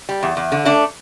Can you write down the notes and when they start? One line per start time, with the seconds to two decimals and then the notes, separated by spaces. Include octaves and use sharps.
0.09 G3
0.23 E2
0.37 E2
0.52 D3
0.65 A3 D4